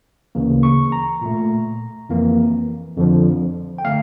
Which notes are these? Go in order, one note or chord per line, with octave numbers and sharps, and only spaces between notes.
D2 C#3 E3 A#3
C#6
A#5
A#2 A3
F2 E3 A#3
F2 D3 F3
G5
D3 A3 F5